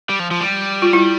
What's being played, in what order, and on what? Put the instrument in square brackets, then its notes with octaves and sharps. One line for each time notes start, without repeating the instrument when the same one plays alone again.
[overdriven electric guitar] G3
F3
F3
G3
[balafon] F4
E4